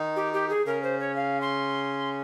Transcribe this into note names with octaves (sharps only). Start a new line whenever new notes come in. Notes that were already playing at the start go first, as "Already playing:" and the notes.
Already playing: D#3 D#4
G4
G4
G#4
C#3 C#4 A#4
C5
C#5
F5
C6